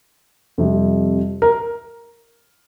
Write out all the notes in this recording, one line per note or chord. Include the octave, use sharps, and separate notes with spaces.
F2 C3 G3
A#4